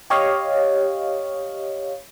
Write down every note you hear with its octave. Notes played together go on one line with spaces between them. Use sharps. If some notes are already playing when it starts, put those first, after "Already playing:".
G4 C#5 D#5 F5